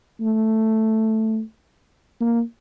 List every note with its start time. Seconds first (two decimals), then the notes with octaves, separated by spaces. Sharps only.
0.21 A3
2.21 A#3